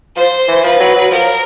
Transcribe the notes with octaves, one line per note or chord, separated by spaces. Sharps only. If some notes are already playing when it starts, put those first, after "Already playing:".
F3 C5
E3
F3 B4
F#3
F#3
F3 A#4